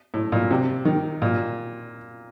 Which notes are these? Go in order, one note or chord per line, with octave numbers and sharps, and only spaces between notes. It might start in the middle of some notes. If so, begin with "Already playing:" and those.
A2
A#2
C3
D#3
A#2